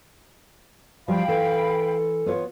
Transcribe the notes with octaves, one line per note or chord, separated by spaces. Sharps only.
F3 G3 F5 G5 B5
E3 A4
B3 F4 C#5